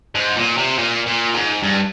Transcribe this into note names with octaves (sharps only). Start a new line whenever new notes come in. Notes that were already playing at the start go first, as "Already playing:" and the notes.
G#2
A#2
C3
A#2
A#2
G#2
G2